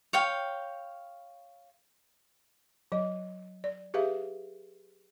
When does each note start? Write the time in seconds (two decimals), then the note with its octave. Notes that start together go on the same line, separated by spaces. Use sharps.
0.13 C#5 F5 G5
2.92 F#3 D#5
3.64 D5
3.94 G4 G#4 B4 E5 F5